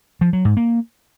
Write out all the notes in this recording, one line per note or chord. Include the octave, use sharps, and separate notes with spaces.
F3
F#3
G#2
A#3